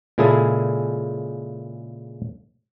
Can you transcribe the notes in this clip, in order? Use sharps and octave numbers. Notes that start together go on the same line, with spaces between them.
A#2 C#3 G#3 E4 G#4 A4